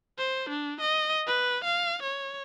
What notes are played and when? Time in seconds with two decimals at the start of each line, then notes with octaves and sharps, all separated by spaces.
0.18 C5
0.50 D4
0.81 D#5
1.27 B4
1.65 F5
2.03 C#5